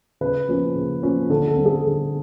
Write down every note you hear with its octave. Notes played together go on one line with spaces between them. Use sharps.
C#3 B4
F3 A#3 C#4
C#3
F3 A#3 C#4
D3 A4
A4
G3 C4
G#4
D3 A4